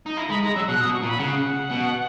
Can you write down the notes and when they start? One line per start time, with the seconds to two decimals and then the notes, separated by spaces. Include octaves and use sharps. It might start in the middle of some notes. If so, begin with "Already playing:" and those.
0.06 D#4
0.17 E4 A#5
0.30 G#3 B5
0.43 G#3 A#5
0.55 F#3 E6
0.68 B2 F#6
0.81 D#6
0.85 B2
0.94 C#6
1.03 A#2
1.07 B5
1.19 C#3 F#5
1.71 B2